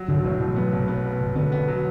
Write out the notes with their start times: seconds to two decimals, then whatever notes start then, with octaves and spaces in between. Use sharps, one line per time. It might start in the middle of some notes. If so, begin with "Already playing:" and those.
Already playing: F#3
0.08 B1 D3
0.24 A2 E3
0.41 B1 F#3
0.56 B3
0.73 B1
0.88 B3
1.05 B3
1.20 B1
1.35 D3 B3
1.52 B3
1.68 F#3